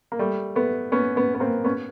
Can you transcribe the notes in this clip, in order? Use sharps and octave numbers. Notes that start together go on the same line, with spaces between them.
A#3
G3 A3
A3 B3
B3 C#4
B3 C#4
B3
A#3 C4
B3 C#4